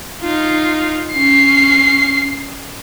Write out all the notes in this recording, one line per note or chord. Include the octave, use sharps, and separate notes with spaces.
D#4 F4
C#4 C7